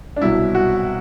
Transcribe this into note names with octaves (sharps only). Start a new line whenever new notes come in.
D4
C2 B2 F#3 E4
F#4